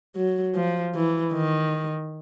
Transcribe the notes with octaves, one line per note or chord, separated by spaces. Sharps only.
F#3
F3
E3
D#3